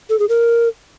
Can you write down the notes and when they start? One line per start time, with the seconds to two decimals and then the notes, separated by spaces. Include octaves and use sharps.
0.10 A4
0.19 G#4
0.29 A#4